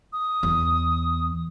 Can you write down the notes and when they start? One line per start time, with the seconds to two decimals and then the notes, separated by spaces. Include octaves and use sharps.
0.13 D#6
0.43 E2